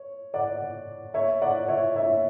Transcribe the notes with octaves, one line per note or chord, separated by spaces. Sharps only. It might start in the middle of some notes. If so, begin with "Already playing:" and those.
Already playing: C#5
D5 F#5
C#5 E5
D5 F#5
C#5 E5
C#5 E5